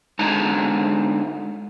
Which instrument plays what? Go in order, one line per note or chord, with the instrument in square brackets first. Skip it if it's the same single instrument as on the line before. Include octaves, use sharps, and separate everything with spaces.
[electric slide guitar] D3 G#3 D#4 A5 A#5